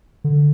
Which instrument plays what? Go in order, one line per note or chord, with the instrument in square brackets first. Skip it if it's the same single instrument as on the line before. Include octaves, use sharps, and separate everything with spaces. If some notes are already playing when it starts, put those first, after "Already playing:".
[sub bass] D3